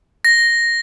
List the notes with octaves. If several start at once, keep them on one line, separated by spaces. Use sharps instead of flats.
A#6